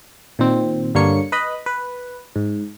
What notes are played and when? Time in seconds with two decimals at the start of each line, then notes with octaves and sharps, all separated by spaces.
0.39 A#2 D#3 C4
0.95 G2 D3 A#3 C#5 C#7
1.32 B4 D#5 B5
1.66 B4
2.36 G#2